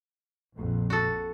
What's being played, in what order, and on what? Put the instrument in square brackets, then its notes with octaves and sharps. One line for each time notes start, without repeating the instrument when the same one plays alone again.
[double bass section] A#1 F2 A#2
[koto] F#4 A4